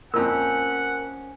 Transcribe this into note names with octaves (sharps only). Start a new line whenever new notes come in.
F2 A#2 C#4 A#4 C5 F#5 E6